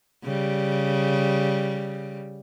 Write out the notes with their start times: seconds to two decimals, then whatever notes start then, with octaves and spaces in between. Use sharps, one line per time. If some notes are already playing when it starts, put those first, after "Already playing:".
0.24 C#3 G3